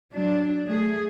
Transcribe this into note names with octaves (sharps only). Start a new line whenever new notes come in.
F#3 D4
A3 G#4